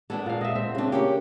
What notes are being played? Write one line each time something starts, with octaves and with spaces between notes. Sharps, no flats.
G#3 B3 D4 A4
A#2 F5
D#5 E5
C4 E5
C#3 G#3 C4 D4
A#3 C#4 G4